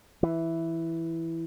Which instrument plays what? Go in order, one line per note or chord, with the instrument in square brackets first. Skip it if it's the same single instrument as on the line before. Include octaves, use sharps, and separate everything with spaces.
[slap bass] E3